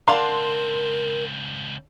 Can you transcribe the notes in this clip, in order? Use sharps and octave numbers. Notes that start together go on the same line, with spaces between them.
C#2 C4 D4 A#4 F5 F#5 C6